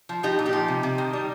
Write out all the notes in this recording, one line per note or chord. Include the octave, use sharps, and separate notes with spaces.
F3
F3 D#4 G4
A#2
D#4 G4
F3
C3
C3
D#3
G3